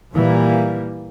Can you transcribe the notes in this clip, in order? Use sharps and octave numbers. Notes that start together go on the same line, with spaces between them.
A#2 E3 G3 A#3